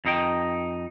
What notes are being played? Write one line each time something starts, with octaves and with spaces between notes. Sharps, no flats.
F2 D#4 G5